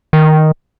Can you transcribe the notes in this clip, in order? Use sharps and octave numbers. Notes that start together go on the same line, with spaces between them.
D#3